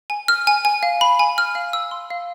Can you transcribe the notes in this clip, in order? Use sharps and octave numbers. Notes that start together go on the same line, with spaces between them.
G#5
F6
G#5
G#5
F5
B5
G#5
F6
F5
E6
C6
F5